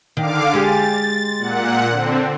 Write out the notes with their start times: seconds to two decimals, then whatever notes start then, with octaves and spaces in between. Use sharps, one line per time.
0.17 D3 D#3 F5 D6
0.54 G#3 G4 G#4 A6
1.38 A#2 F#5
1.89 D3 C4